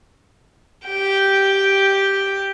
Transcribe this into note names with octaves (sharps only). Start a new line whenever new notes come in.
G4 G5